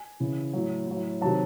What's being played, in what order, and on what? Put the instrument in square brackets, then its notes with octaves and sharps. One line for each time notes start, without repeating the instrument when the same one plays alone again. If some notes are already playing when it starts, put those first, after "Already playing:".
Already playing: [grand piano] G#5
C#3 E3
A2 F#3
A2 F#3
C3 D#3 F#3 A5